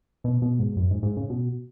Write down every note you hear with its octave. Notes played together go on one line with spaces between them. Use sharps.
B2
B2
G#2
F#2
G#2
G#2
C#3
B2